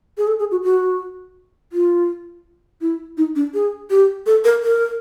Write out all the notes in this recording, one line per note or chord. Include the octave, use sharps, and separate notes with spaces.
G#4
A4
G#4
F#4
F#4
F4
E4
D#4
D4
G#4
G4
A4
A#4
A#4